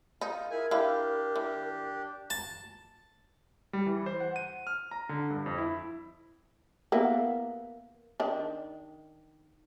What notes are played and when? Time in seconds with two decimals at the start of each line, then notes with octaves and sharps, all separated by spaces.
0.21 D#4 F4
0.51 E4 G#4 A#4 G#5
0.71 D4 E4 G4 F5
1.36 E3
2.30 A5
3.73 G3
3.86 E3
4.06 C5
4.20 F#5
4.36 D#7
4.67 F6
4.91 A#5
5.09 D3
5.30 G2
5.46 F2
5.58 E4
6.92 A#3 B3 E4
8.20 D#3 D4